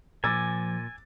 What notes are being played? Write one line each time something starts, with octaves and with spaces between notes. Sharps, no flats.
A#2 F3 G#5 D6 E6 A6